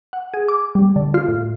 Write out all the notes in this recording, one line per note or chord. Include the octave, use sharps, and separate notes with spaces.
F#5
G#4
D6
G3
D3
F4
A2